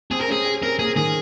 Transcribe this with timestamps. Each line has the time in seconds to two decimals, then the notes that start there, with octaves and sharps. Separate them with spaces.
0.11 C4 G#4
0.21 A#4
0.28 C#4 G#4
0.45 C#4
0.62 C4 A#4
0.79 A#3 G#4
0.96 D#3 G#4